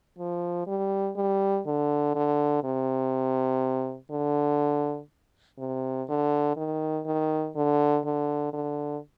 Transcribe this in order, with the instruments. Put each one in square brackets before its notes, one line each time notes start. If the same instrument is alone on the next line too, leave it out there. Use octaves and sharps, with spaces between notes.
[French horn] F3
G3
G3
D3
D3
C3
D3
C3
D3
D#3
D#3
D3
D3
D3